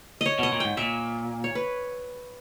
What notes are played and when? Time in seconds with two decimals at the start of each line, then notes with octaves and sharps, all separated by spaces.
0.21 C#5 D#5
0.39 B2
0.43 D#5
0.52 A#2
0.60 G#2 G5
0.77 A#2 E5
1.44 C#5
1.55 B4